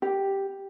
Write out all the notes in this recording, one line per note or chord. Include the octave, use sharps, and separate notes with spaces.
G4